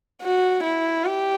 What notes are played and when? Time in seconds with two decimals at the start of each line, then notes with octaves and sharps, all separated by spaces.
0.23 F#4
0.64 E4
1.05 G4